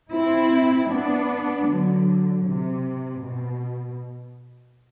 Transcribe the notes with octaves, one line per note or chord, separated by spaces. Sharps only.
C4 E4
B3 D4
D3 F#3
C3
B2